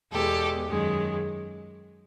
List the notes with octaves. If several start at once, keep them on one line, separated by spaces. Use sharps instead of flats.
E2 B2 G#3 G4 A4
F#2 D#3 G#3